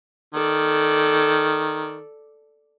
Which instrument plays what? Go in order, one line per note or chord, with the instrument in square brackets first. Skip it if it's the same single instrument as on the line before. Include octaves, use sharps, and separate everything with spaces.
[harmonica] D#3 [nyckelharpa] A4 D5